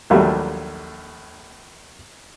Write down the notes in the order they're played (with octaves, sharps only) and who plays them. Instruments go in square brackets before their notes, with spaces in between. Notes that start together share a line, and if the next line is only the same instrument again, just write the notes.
[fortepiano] A#1 D#2 F#3 G3 A3